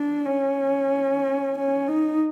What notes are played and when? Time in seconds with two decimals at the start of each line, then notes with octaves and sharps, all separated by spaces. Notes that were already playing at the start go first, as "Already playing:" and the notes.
Already playing: D4
0.26 C#4
1.58 C#4
1.88 D#4